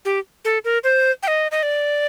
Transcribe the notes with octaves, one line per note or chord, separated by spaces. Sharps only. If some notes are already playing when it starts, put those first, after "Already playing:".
G4
A4
A#4
C5
G5
D#5
D#5
D5